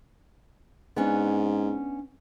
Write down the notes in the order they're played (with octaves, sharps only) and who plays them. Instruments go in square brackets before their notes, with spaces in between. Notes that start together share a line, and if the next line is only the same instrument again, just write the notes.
[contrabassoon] G#2 [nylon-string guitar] B3 C#4 D4